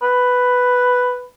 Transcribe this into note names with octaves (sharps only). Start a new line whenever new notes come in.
B4